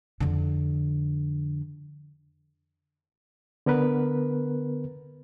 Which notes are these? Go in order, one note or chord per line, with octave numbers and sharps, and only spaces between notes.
F2 D3
D3 B3 A#4 B4